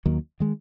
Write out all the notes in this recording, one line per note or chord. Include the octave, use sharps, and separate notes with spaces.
D#2 D#3 F#3 A#3
D#3 G#3